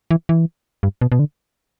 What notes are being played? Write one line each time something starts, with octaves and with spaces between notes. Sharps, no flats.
E3
E3
G2
B2
B2
D3